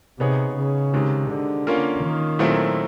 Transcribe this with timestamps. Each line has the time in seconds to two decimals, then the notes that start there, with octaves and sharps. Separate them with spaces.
0.19 C3 B3 D#4 G#4 C#5
0.56 C#3
0.93 C3 D#3 G#3
1.30 D3
1.67 A#3 C#4 F4 A#4
2.03 D#3
2.39 A#2 F#3 A3 C4 E4